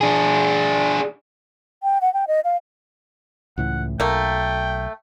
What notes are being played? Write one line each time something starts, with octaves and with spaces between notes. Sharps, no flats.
D4 G#4
G5
F#5
G5
D#5
F5
C#2 A2 E3 F#5
B1 A3 A#3 G5